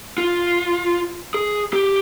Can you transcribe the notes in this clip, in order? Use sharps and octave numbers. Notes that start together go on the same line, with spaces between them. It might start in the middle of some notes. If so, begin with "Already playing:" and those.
F4
G#4
G4